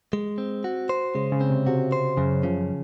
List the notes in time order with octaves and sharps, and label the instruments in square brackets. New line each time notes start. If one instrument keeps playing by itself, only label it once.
[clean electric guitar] G#3
C4
F#4
C5
[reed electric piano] C#3 [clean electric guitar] G#3
[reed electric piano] C#3
[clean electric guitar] C4
[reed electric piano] C3
[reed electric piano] C3 [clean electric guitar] F#4
[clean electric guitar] C5
[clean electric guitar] F#2 [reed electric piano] C#3
[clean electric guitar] C#3 [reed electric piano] F3